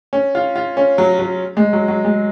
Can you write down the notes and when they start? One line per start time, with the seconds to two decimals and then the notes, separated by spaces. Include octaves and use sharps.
0.13 C#4
0.35 F4
0.56 F4
0.77 C#4
0.98 F#3
1.19 F#3
1.57 G#3
1.73 F#3
1.88 F#3
2.05 G#3